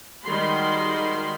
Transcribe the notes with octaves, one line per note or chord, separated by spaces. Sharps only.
D#3 G3 G#3 F#4 B5 C6